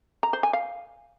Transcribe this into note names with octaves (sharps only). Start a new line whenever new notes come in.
A#5
C5
G#5
F5